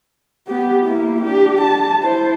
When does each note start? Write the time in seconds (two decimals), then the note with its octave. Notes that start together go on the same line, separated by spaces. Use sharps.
0.48 B3 G4
0.86 A#3 E4
1.21 D4 G4
1.61 A5
2.02 E4 C5